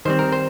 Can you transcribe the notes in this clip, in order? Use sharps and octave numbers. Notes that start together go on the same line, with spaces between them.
D#3 G3 C4 C5
A#4
C5